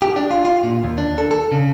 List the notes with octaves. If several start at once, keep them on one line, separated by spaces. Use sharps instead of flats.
G4
D4
F4
F4
A#2
D#2
D4
A4
A4
C#3